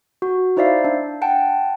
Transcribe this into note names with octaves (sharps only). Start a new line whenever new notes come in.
F#4
D#4 E4 C5 D5 E5 F5
D4
F#5 G5 A5